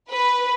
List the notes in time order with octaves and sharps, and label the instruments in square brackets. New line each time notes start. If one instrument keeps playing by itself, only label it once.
[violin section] B4